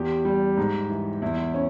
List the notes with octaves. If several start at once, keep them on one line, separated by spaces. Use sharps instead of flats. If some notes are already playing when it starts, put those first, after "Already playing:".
Already playing: E2 G4
G3
G#2
E3
E2 E4
C#4